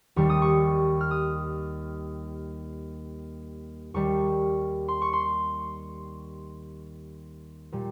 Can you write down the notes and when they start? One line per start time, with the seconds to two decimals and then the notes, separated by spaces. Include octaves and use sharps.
0.16 D#2 D#3 G3 C#6
0.30 D#6
0.42 C#6
1.01 F6
1.11 D#6
3.94 D#2 D#3 G3 C#6
4.88 C6
5.02 C#6
5.13 C6
7.72 A#2 G3